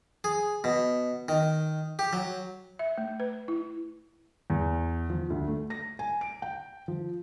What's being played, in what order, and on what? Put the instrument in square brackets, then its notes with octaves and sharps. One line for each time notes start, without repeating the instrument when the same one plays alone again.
[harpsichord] G#4
B2
D#3
G4
F#3
[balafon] E5
A3
B4
E4
[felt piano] E2
F3
D2
A3
A#6
G#5
D7
G5
F3